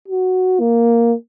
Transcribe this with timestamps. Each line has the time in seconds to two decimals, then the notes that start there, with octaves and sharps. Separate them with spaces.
0.08 F#4
0.60 A#3